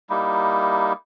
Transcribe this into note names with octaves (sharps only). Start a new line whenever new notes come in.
G3 A#3 D#4 E4